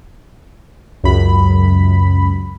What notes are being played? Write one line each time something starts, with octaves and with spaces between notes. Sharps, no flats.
C#2 F#2 B5